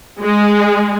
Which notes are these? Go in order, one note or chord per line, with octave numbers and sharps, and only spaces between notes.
G#3